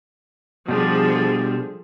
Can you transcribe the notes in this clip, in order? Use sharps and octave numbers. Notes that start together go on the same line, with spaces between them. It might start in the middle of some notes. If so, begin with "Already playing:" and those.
B2 F3 G3 D4 G#4 A4